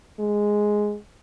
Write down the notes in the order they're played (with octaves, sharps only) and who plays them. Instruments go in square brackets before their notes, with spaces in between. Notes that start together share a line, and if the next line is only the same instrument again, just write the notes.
[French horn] G#3